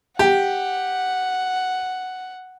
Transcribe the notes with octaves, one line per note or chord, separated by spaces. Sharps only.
G4 F#5